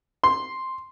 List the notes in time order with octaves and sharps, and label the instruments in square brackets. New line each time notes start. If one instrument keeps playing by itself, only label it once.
[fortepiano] C6